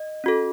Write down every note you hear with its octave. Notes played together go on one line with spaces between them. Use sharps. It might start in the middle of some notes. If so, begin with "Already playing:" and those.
Already playing: D#5
C#4 F#4 A4